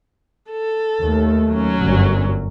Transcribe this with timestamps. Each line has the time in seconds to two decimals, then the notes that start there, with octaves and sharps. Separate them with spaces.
0.51 A4
1.01 D#2 A3
1.51 F#3 C#4
1.82 G1 F#2